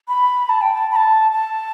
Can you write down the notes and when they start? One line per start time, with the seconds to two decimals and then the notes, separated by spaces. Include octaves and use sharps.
0.08 B5
0.49 A5
0.62 G5
0.75 A5
0.91 B5
0.96 A5
1.32 A5